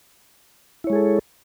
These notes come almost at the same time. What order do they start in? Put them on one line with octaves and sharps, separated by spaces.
E4 C#5 G#3 G#4 A4